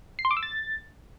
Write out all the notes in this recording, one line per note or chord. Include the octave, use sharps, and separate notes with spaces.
C7
C6
D6
E6
A6